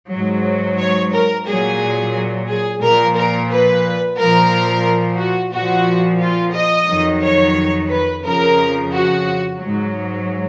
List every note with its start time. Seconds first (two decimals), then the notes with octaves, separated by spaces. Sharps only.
0.10 G#2 F#3
0.78 C#5
1.12 A#4
1.46 A#2 F#3 G#4
2.47 G#4
2.81 A#2 F3 A#4
3.16 A#4
3.49 B4
4.17 A#2 F3 A#4
5.18 F#4
5.53 A#2 F3 F#4
6.20 F4
6.54 D#5
6.88 F2 D#3 F#3
7.22 C#5
7.90 B4
8.24 F2 C#3 F3 A#4
8.92 F#4
9.60 G#2 F#3